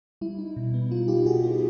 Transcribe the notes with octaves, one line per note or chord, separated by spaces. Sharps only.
G3 E4
D#4
B2
B3
G3 F4
D#4 F4 G4
B2 F#4 G#4
B3